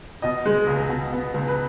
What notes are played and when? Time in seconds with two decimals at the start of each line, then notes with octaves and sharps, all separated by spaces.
0.22 B2 D#5
0.46 G#3
0.67 C#2
0.89 B2
1.12 B3
1.34 C#2
1.48 B4